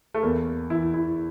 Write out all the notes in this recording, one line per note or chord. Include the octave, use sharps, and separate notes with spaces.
A3
E2 A#3
E3 E4
E4